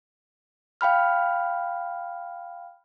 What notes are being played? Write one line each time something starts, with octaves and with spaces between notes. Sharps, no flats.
F5 G5 B5 F6